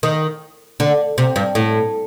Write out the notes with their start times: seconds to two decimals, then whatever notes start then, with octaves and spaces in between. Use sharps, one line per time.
0.03 D#3
0.80 D3
1.18 C3
1.36 G2
1.55 A2